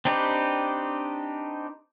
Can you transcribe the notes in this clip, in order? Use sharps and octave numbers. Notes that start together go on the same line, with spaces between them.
C4 D4 D#4 G4 B4